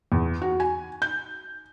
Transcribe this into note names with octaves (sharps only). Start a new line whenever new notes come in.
E2
F#4
G#5
G6